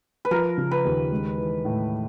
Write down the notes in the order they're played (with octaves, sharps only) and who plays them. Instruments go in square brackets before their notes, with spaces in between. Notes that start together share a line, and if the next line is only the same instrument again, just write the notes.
[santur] B4
[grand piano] F3 [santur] A#4
[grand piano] C#3
[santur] B4
[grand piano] D#2
G#3
E3
A2